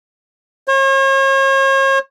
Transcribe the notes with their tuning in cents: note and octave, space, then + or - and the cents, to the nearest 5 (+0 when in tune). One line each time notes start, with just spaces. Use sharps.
C#5 -40